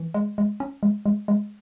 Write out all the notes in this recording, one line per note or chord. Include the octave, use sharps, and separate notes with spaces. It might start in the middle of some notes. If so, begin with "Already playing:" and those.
Already playing: E3
G#3
G#3
C#4
G#3
G#3
G#3